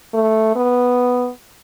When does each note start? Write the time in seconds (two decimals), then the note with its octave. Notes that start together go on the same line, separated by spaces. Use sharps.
0.14 A3
0.56 B3